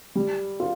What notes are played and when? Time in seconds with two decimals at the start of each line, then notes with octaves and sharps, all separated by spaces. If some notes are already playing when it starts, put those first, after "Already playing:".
0.15 G3
0.60 F4